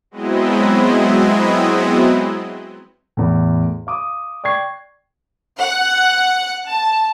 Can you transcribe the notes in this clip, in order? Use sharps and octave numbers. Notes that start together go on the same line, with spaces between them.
F#3 G#3 B3 C4 E4 D#5
E2 A2
F5 D6 D#6
D5 G5 C#6 G#6 C7
F#5
A5